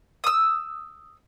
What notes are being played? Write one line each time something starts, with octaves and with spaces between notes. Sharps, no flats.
D#6 E6